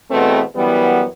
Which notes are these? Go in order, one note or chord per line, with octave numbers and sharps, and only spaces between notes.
E2 B2 A3 B3 C4
F#2 E3 G3 B3